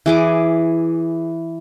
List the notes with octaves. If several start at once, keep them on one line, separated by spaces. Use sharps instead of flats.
E3 G#4 D6